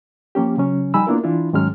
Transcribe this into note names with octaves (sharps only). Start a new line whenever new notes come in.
F3 A#3 C#4 G4
C#3 F#3 C#4
F3 G3 D#4 G#5 B5 E6
A#3 B3 D4 E4 F4 A#4
E3 D4 E4 F4
G#2 D#3 F#3 G#3 C#4 F6